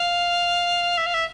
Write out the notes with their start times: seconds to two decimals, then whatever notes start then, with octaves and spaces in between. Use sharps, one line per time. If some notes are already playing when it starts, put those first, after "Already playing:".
Already playing: F5
0.98 E5
1.06 F5
1.14 E5